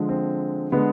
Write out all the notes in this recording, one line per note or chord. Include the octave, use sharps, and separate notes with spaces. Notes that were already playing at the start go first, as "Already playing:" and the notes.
Already playing: D3 F3 G#3
C4
D3 G#3 B3